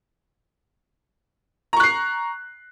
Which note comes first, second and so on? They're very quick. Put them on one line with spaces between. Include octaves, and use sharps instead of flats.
A#5 C#6 F#6 C7